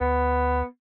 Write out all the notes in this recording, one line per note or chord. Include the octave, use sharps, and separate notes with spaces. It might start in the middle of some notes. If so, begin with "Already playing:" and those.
D2 B3